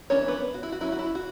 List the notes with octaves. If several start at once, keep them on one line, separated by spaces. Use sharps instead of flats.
E3 B3 C#4 D4 C#5
B3 B4
F#4
E4
F#4
F#3 C#4 E4
F#4
E4
F#4